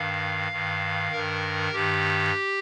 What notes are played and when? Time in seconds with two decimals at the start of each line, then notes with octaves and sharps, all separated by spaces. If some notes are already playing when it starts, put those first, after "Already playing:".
Already playing: G2 D#3 F5
0.52 G2 D#3
1.12 G2 D#3 A#4
1.72 G2 D#3 G4